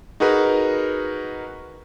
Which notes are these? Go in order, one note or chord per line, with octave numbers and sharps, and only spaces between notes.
D#4 F#4 G#4 A#4 B4